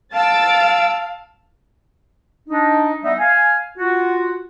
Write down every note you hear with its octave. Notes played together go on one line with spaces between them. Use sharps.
F5 A5 E6 A6 D7
D4 D#4
G3 B3 D#4 E5
F5 G#5
F4 F#4